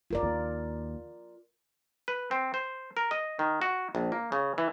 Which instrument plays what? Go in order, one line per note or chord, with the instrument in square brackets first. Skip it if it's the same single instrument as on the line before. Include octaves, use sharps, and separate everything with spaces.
[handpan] F4 A#4 D5
[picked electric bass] D#2
[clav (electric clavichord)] B4
C4
C5
A#4
D#5
D#3
F#4
A#1
A#3
C#3
E3